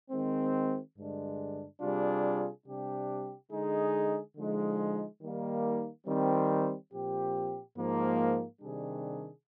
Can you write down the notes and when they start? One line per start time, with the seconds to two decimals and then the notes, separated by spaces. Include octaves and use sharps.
0.11 D#3 G#3 C4
0.97 G2 D3 G#3 D4
1.81 C3 G3 D4 F4 G#4
2.66 C3 G3 D4 G4
3.51 D3 G#3 D#4 G#4
4.36 D3 F3 G#3 D#4
5.22 D#3 G3 A#3 D#4
6.07 D#3 G3 C4
6.92 A#2 F3 C4 G4
7.77 G#2 F3 A#3
8.62 C3 D#3 G3 D4 G#4